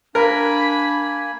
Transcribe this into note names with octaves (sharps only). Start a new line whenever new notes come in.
A#3 D4 A#4 G#5 B5